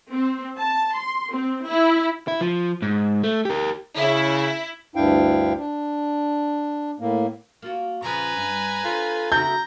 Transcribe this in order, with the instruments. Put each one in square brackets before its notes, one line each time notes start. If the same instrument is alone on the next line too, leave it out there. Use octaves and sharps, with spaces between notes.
[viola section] C4
A5
C6
C4
E4
[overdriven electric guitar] E4
F3
G#2
A3
G4 A#4
[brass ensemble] C#3 [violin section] E4
[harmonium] D2 G2 D4 E4 F5 G5
D4
A2 A#3
[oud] A#3 F4 F#4
[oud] A#2 C#3 F3 [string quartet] B4 G#5 A#5
[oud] G2
[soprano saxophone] F4 [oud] A4 C5
[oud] C#3 E4 F#4 [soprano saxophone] A#5 [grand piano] G6